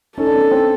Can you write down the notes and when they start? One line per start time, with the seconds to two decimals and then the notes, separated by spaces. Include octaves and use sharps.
0.18 C#4 D#4 A4
0.27 D4
0.34 B3 C#4
0.51 C4 D4